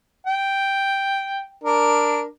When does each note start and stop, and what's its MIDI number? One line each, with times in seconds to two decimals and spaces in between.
0.27 1.52 79
1.64 2.24 62
1.64 2.24 70